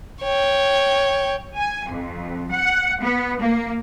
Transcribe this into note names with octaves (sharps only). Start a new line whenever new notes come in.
C#5 G5
G#5
F2
F#5
B3
A#3